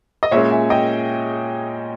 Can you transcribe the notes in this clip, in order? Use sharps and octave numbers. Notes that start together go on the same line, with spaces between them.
D#5
A#2 G#3 C#4 C#5 E5
E5 G#5
D#5 G5